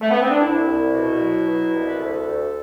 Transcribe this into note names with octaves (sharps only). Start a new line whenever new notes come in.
A3
B3
C4
D4
C2 E4
C2
B2
F#3
B2
C2
B4
D2 A4
D2